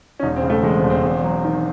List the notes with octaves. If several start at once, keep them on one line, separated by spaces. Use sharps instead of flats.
C#4
E1 D#4
C4
C#3
A3
E2 G#3
C4
E1
C4
E2
F#3
D#3